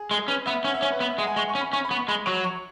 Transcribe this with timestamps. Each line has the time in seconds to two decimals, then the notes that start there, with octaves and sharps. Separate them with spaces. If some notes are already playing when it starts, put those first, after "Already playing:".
Already playing: G#4
0.11 G#3
0.19 G#4
0.28 C#4 B4
0.46 B3 E5
0.64 C#4 F#5
0.74 E5
0.82 C#4 C#5
0.92 B4
1.00 B3
1.10 E5
1.18 G#3 F#5
1.27 G#5
1.36 G#3 C#6
1.49 C#6
1.55 C#4
1.61 B5
1.72 C#4 C#6
1.85 B5
1.91 B3
1.97 C#6
2.08 G#3 B5
2.26 F#3 C#6
2.44 C#6